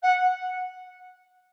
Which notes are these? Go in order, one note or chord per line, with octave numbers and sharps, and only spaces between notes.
F#5